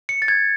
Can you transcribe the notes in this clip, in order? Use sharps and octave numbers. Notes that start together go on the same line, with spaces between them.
C#7
A6
G#6